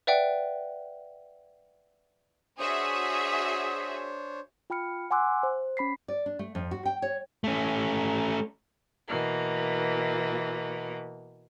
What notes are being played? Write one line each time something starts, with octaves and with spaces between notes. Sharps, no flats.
B4 D5 E5 F#5 G5
D4 F#4 G#4 C5 C#5 E5 D#6
F4 G5 B5 F6 C#7
F#5 G#5 C6 D6 E6 F#6
C5
C#4 B5 B6 C7
D5
D4
A3
F2
F#4
G5
C#5
A3 C#4
B2 E3 A#3